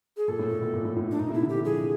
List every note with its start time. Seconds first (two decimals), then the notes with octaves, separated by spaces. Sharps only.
0.17 G#4
0.28 A#2 A4
0.39 A2
0.50 A#2
0.62 B2
0.74 A#2
0.85 A2
0.96 A2
1.08 A2 D4
1.19 A#2 D#4
1.30 C3 E4
1.42 D3
1.49 E3 G4
1.65 F3 G#4